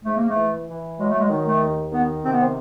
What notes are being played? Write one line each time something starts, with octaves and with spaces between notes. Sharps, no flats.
G#2 A3
A#3
A3
E3
E3
F#3 G#3
A3
G#3
D#3
A3
D#2
D#3 B3
C3 C4
B3
C4